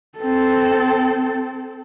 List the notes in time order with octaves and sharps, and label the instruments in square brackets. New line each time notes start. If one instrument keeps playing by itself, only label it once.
[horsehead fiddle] C4 A4